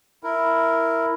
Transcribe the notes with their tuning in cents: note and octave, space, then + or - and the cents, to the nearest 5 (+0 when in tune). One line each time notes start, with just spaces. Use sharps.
E4 +0 A#4 -5